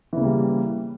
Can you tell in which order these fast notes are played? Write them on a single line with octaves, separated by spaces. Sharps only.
E3 C#3 A#3 G3